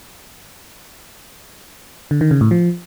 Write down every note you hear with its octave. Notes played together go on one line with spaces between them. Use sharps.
D3
D#3
C#3
A2
F3